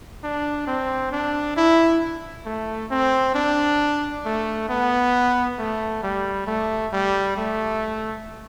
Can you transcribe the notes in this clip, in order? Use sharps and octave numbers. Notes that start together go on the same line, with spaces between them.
D4
C4
D4
E4
A3
C4
D4
A3
B3
A3
G3
A3
G3
A3